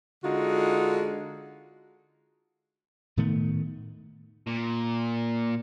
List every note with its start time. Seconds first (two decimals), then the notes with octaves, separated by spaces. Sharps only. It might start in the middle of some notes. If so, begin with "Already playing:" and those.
0.24 D3 G#3 D#4 F4 F#4
3.17 A2 D#3 A3 B3
4.47 A#2